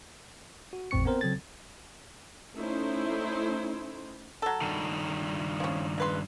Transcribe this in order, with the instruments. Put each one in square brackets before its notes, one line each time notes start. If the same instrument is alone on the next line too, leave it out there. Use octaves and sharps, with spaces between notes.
[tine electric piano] F#4
G#1 E2 A2 C4 C#6 C#7
B3 C4 A#4 C5
C#3 F#3 C4 A4 G#6 A6
[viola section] A3 C#4 D#4 E4 C5
[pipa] F#3 A4
[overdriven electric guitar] G2 D#3
[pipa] F3 C#4
C#3 B4 C6